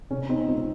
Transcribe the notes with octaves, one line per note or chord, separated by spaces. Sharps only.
C3 C#4
C4 D#4
C#2 C4 D#4